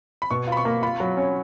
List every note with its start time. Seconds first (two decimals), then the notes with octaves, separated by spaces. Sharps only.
0.22 B5
0.31 B2 C#6
0.47 F4 B5
0.57 C#6
0.65 A#3
0.82 F4 B5
1.00 F#3
1.17 C#4